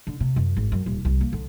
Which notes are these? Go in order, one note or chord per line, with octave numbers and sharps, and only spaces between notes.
D3
C3
F#2
G#1
F#2
D#1
C2
A#3
D3